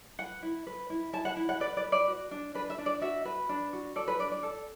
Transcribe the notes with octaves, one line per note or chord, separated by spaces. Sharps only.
B4 F#5
E4
B4
E4
E4 A5
F#5
E4
F#5
B4 D5
D5
B4
D5
F#4
D4
D4 B4
E5
D4
D5
F#4 E5
B4
D4
F#4
A4 D5
B4
D4 D5
D5
A4